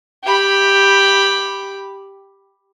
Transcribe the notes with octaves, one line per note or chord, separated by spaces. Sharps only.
G4 B5